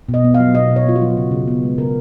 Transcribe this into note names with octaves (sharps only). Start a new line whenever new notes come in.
B2
D#5
B3
F5
F#3
B2 D#5
B2
C#5
B3 F4
F#4
F#3
C#3
C#3
B3
G#3
C#3 A#4